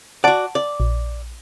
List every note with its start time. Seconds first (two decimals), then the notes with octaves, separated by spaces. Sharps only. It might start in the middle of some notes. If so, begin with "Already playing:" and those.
0.24 F#4 D5 F#5 A5 D7
0.55 D5
0.80 A#1